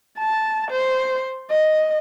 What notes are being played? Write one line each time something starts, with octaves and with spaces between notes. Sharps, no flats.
A5
C5
D#5